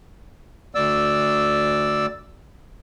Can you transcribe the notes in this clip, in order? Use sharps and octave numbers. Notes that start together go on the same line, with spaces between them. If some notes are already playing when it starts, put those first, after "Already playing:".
D2 D5 E6